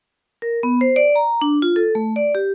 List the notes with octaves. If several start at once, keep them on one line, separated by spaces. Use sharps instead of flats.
A#4
B3
C5
D5
A#5
D4
F4
A4
A3
D5
G4